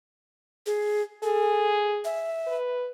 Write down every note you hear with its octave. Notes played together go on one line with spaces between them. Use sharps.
G#4
G#4 A4
E5
B4